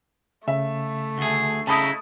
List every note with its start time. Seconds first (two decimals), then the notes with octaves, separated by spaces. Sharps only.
0.48 C#3 A3 E5
1.18 D2 G#4
1.67 C#3 D#4 E4 A5 B5 D#6